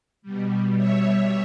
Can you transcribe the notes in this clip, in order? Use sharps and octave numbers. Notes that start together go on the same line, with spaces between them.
B2 G3
C#5 E5